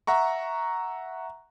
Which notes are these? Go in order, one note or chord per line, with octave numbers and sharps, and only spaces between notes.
E5 F#5 A#5 C#6